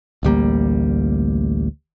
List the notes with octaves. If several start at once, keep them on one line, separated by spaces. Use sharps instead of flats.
A1 D2 G3 A#3